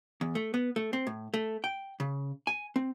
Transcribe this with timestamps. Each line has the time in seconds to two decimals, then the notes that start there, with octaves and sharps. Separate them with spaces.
0.21 E2
0.35 A3
0.54 B3
0.76 A3
0.93 C4
1.07 A2
1.34 A3
1.64 G5
2.00 C#3
2.47 G#5
2.76 C4